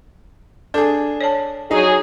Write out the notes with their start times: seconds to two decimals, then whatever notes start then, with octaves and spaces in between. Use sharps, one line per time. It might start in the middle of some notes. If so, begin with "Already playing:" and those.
0.74 D4 G#4 A4
1.21 C#5 D5 A5
1.71 F#3 D#4 G#4 D5